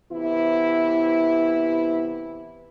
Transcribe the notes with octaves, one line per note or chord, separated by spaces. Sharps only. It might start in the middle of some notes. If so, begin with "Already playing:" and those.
C3 E3 B3 E4